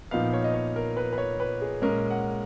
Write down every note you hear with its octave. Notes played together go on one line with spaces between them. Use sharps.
A#2 F3 B3 D#4 F5
C#5
D#5
C#5
A#4
B4
B4
C#5
B4
G#4
A#2 G#3 C#4 A#4
F#5